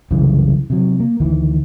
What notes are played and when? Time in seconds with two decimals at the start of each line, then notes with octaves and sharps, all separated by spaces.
0.11 C2 F#2 C#3 E3
0.70 C3 F#3
1.00 A#3
1.20 D2 D#3 E3